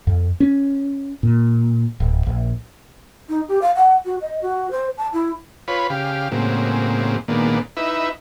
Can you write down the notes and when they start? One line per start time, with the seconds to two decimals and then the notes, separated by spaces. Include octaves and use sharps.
0.07 F2
0.40 C#4
1.23 A#2
2.00 D1
2.26 A#1
3.29 D#4
3.48 G4
3.62 F5
3.76 F#5
4.05 F#4
4.21 D#5
4.42 F#4
4.71 C5
4.98 A5
5.13 E4
5.68 F4 B4 C#5 B5
5.90 C#3 G4 F5
6.32 A2 C#3 F#3 G#3 A#3 C4
7.28 A#2 D#3 G#3 A#3 B3 D4
7.77 D#4 E4 B4 E5